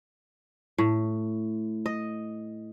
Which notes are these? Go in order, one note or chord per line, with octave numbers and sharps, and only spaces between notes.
A2
D#5